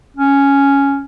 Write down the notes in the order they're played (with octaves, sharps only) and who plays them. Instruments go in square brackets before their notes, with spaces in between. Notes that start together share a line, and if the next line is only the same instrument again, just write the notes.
[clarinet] C#4